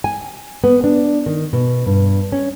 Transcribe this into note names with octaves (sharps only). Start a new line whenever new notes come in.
G#5
B3
D4
D#3
B2
G2
C#4